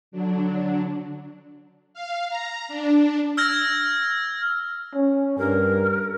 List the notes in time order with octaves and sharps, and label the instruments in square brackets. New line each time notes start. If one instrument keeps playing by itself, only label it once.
[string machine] D3 F#3 D4
F5
A#5
D4
[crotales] E6 F6 G#6 A#6
[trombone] C#4
[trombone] G2 [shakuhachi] A#4